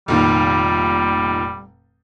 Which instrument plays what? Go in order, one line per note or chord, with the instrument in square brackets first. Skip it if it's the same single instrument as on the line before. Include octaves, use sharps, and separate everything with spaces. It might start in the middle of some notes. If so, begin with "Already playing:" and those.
[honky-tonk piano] F1 A#2 D#3 [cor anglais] G3